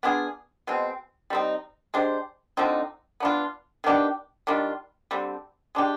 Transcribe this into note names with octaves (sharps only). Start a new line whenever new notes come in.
B3 D4 F4 G#4
B2 G#3 C4
G3 C4 D#4
G#3 D4 G4 C5
D3 F3 C4 D#4
B3 D4 F4
D#3 B3 D4 G4
D#3 G3 D4 F4
D3 G3 C4
G#3 D4 G4